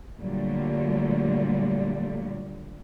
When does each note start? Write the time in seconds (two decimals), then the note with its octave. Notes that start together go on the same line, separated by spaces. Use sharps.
0.20 A#2 D3 F#3 G3 A3